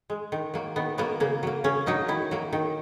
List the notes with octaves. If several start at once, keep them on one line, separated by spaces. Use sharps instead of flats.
G#3
D#3
F#3 A#3
D#3 B3
F#3 A#3 B3
C#3 A#3
F#3 A#3
C#3 C#4
F#3 A#3 D#4
D#3 E4
F#3 A#3
D#3